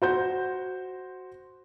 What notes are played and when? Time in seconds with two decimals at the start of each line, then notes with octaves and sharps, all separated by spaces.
0.02 F#4 C5 G6